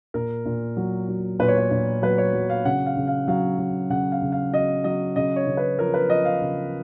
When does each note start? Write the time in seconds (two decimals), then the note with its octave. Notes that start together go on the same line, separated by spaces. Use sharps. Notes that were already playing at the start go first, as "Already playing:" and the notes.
0.14 A#2 A#4
0.45 A#2
0.77 F#3
1.09 F#3
1.39 A#2 B4
1.48 C#5
1.58 B4
1.71 A#2
2.02 F#3 B4
2.18 C#5
2.33 F#3
2.50 F5
2.65 C#3 F#5
2.86 F5
2.97 C#3
3.07 F5
3.28 F#3 F5
3.58 F#3
3.90 C#3 F#5
4.12 F5
4.22 C#3
4.32 F5
4.53 F#3 D#5
4.84 F#3 D#5
5.16 C#3 D#5
5.36 C#5
5.47 C#3
5.57 B4
5.78 F3 A#4
5.94 B4
6.09 F3 D#5
6.25 F5
6.41 C#3